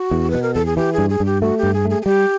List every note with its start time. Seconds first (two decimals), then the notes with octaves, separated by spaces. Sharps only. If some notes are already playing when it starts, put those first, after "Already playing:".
Already playing: F#4
0.11 E2
0.30 B2 B4
0.43 A#4
0.54 E2 A4
0.66 G#4
0.77 E3 G4
0.93 G#4
0.98 G2
1.10 G#4
1.20 G2
1.25 G4
1.42 A3 F#4
1.58 G4
1.63 G2
1.74 G#4
1.85 A3 G#4
2.02 G#4
2.06 G3 G4